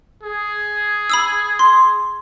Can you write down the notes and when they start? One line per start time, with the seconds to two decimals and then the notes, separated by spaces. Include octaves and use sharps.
0.23 G#4
1.10 B5 D#6 E6
1.59 C6